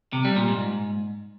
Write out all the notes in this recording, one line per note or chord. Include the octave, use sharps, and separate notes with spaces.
C3
G3
A#2
G#2